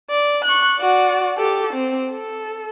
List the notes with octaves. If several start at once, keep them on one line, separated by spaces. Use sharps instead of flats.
D5
C#6 F#6
F#4 D5
G4 A4
C4
A4